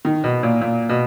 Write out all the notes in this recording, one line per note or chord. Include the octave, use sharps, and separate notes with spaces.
D#3
B2
A#2
A#2
B2